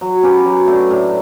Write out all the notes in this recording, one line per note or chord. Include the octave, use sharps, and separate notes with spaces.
F#3
C#4 G4 B4
F#3
A3 D4
A2